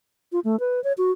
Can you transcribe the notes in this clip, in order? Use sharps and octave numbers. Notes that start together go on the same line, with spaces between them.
F4
A3
B4
C#5
F#4